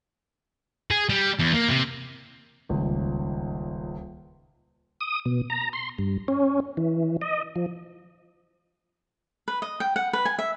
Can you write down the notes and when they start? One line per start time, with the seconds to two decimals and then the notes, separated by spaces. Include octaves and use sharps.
0.91 G#4
1.09 G3
1.39 E2
1.53 A#3
1.69 C3
2.69 D#1 C#2
5.01 D#6
5.26 B2
5.50 A#5
5.73 C6
5.99 G2
6.28 C#4
6.77 E3
7.21 D#5
7.56 F3
9.48 B4
9.62 D#5
9.80 G5
9.96 F#5
10.13 B4
10.25 G#5
10.39 E5